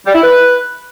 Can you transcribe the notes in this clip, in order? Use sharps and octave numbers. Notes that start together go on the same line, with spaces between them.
G3
E4
B4